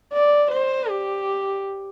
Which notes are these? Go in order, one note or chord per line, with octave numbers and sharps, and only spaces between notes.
D5
C5
G4